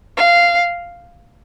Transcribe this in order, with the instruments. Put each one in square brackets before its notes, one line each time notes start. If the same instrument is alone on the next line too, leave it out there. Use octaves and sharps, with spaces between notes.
[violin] F5